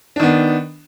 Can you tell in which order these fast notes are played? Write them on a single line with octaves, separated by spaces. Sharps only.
D4 D#3 B3